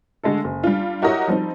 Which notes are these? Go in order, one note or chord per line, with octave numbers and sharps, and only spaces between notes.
D3 G#3 A3 A4
F#1
G3 D4 F4
E4 F#4 G4 A#4 C#5 D#5
F3 G3 C4 D#4